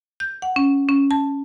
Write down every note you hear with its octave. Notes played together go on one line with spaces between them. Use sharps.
G6
F#5
C#4
C#4
A5